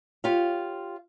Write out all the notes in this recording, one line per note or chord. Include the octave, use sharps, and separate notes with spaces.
F4 G4 C#5 F5